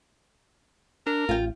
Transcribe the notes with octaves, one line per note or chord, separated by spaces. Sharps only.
D4 A#4
A1 F4 G5